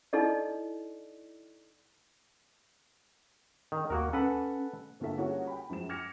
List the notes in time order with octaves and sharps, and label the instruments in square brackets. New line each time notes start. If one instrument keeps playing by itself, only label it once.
[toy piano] D#4 E4 A4 D5 D#5
[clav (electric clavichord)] D#3
[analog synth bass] D#2 [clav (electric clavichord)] A#3 F#4 A#4
[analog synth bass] C#4 [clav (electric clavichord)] A4 B4 F#5
[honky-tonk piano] G1 D3 A#3 F4 A4 E5
G3 A#3 C#4 F4 F#4 G#4
G5 B5
F#2 F3 G#3 E7
D6 F6 G#6 A#6 C#7